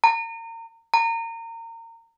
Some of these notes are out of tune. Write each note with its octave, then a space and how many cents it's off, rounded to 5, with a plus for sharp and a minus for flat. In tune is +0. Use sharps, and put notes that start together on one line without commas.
A#5 -35
A#5 -30